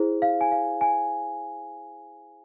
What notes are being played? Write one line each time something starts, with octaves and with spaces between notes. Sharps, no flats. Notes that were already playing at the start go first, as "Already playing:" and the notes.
Already playing: E4 G#4 C5
F5
G#5
F5
G#5